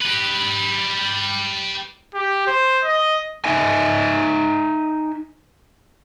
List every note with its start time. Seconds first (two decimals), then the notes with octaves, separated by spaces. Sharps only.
0.01 G4 B4
2.15 G4
2.47 C5
2.84 D#5
3.45 D#4 D#5 E5 G#5